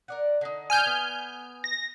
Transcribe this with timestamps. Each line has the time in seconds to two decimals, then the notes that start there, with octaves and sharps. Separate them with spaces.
0.08 A#4 D5 F#5
0.41 D3 D#4
0.70 G#5 F6 G6
0.86 B3
1.64 A#6